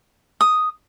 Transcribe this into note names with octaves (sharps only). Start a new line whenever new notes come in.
D#6